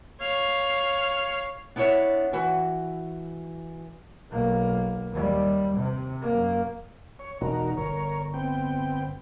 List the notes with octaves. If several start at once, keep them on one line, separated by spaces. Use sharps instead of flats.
C#5 F5
B3 D4 E4 C5 C#5 E5
E3 F#4
B1 A#3
D#2 G3
C3
F#2 A#3
C#5
E1 D#4 F#4 A#4
G1 A#4 C#5
B3 C4 G5